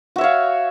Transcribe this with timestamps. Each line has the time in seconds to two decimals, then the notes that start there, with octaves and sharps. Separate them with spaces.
0.16 F#4
0.18 E5
0.21 C#5
0.24 F5